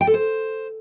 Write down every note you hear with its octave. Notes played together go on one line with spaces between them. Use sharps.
G5
A4
C5